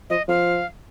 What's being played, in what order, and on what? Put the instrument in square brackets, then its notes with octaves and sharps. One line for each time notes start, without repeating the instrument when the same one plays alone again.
[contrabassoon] F3 [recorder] D#5
[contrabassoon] F3 [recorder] F5